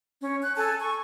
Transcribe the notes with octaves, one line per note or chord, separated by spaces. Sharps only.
C#4
F#6
A4 G#5 A5
C#6